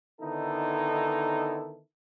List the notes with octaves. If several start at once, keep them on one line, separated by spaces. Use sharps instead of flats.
D3 D#3 B3 D#4 E4 A4